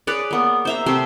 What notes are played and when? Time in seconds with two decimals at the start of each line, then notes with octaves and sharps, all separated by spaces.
0.07 G#4 B4 C#5 D5
0.31 A#3 B3
0.65 C5 E5 A#5
0.86 C3 A3 C6